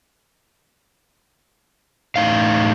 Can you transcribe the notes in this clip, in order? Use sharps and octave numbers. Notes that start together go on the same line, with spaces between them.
A2 D#4 F5